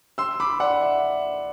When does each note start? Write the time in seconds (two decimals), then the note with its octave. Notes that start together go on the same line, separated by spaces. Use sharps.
0.18 C6 E6
0.40 B5 D6
0.60 D5 F#5
0.81 E5